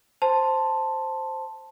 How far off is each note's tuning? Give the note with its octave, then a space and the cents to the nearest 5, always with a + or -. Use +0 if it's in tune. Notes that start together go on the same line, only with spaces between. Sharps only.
C5 +0 A5 +0 C6 +0